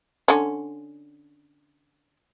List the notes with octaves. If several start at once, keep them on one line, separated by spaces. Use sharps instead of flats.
D3 C#4